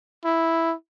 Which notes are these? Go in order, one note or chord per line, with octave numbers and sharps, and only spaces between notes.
E4